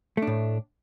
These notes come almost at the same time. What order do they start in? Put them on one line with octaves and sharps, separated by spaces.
A3 D4 A2